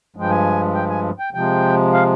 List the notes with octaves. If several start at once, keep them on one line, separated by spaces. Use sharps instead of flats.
G2 F3 G#3 G5
G#5
G5
G#5
G5
C3 F3 G#3 G5
F5